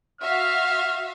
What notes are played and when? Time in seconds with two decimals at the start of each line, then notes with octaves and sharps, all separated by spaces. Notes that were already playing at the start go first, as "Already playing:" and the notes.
0.21 F#4 E5 F5 F6